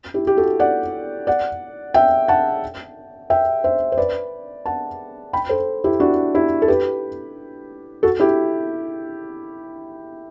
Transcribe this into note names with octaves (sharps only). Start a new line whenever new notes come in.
E4 G4
G4
F#4 A4
D5 F#5
D5 F#5
E5 G5
F#5 A5
E5 G5
C5 E5
C5
B4 D5
F#5 A5
G5 B5
A4 C5
E4 G4
D4 F#4
E4 G4
A4
G4 B4
F#4 A4
E4 G4